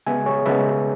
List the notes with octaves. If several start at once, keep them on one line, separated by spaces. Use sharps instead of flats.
C#3 G#3 B3 E5 G#5
G#4 C#5
C#3 G#3 B3 B4 E5